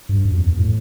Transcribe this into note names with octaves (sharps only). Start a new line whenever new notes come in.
G2
F#2
E2
A2